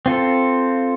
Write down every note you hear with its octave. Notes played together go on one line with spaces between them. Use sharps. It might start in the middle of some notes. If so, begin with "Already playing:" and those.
C4 F4 A4